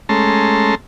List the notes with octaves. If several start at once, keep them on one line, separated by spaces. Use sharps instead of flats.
G#3 A3 C#4 A5 A#5 C6